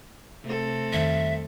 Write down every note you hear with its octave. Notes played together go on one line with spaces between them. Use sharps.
C3 A3 C4 A4
F2 D#3 G3 E5